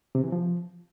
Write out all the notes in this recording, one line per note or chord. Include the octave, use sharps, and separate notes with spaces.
C3
E3
F3